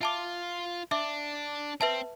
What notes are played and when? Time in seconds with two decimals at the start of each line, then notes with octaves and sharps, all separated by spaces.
0.01 F4 E5 A5 D6
0.91 D4 E5 A5 D6
1.81 C4 B4 E5 A5